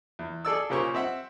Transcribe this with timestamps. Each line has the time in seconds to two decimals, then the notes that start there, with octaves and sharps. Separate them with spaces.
0.19 E2
0.45 G#4 A4 D5 E6
0.70 A#2 C#3 G4 A#4 C5 C#6
0.95 C4 E5 F#5